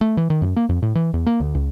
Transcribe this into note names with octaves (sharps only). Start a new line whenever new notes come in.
A3
E3
D#3
F#2
A#3
F2
A2
E3
E2
A#3
D2
C#2